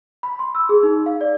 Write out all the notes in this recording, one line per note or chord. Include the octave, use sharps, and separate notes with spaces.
B5
C6
E6
G#4
D#4
F5
D5